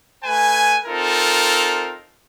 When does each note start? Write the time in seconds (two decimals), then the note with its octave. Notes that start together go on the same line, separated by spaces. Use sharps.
0.24 A3 B4 G#5
0.86 C4 D#4 F4 A4 A#4